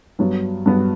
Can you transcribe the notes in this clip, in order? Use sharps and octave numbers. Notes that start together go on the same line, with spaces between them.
G2 F#3 B3
G2 F#3 B3